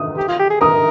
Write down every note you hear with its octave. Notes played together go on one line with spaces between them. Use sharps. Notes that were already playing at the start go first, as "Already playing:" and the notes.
Already playing: D#6
G4
F4
G4
G#4
A#4 D#6